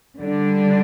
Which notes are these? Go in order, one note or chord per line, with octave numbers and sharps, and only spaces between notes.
D3 G3 D4